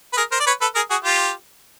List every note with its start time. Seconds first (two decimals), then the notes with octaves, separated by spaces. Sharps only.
0.13 B4
0.17 G#4 A#4
0.32 A#4 C5
0.40 D5
0.47 B4 C#5
0.61 A4 B4
0.75 G#4 A#4
0.91 F#4 G#4
1.04 F4 G4